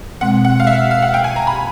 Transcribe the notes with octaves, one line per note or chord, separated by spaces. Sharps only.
B2 G#3 C4 F#5
F#5
F5
E5
F5
F#5
G5
G#5
A#5
B5